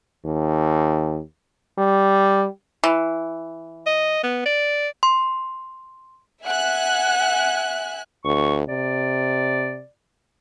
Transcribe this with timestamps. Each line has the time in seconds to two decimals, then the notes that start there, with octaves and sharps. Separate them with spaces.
0.25 D#2
1.79 G3
2.84 E3
3.86 D#5
4.23 B3
4.45 D5
5.03 C6
6.45 E5 F#5 G#5 F#6
8.25 D2 C#6
8.68 C3 D5